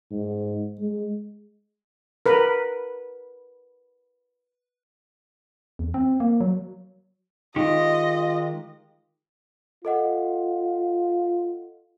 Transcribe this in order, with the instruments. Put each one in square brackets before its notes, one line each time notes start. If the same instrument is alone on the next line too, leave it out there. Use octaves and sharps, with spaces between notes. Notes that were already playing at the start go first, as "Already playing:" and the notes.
[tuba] G#2
G#3
[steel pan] A#4 B4
[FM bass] E2
C4
A#3
F#3
[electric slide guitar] D#3 G#3 G4 [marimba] D#4 [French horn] F4 [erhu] D#5
[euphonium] F4 [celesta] A4 D#5 F#5